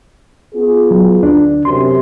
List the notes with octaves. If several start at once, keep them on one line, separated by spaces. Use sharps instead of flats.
B3 F4 G#4
F#3
D2 D4
F#2 C3 C6